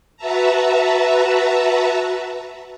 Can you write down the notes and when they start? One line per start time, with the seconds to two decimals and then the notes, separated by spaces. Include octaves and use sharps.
0.17 F#4 B4 E5 A5 A#5